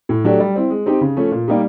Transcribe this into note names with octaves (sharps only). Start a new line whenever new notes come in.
A2
F#3 A3 D4 G4
G3
C4 E4
G#3
C4 D#4 G4
C#3
F3 A3 C#4
A#2
G3 A#3 D#4 G4